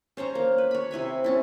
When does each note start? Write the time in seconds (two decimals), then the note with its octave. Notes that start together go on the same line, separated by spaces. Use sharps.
0.17 C#4 C5 C#5 A#5
0.35 A#3
0.58 B4
0.71 C#5 B5
0.91 C3 E4 G#5 B5
1.24 C4 C#4 E4